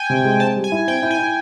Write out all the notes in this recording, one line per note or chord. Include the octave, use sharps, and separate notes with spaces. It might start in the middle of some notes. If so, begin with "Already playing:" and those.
Already playing: G5 G#5
C3
G#3
C4 A5
G3
G#5
E4
C4 G5
E4
G#5
E4